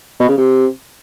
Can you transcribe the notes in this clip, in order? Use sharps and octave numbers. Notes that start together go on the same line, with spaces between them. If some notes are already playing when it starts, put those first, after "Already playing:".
B2
C#3
C3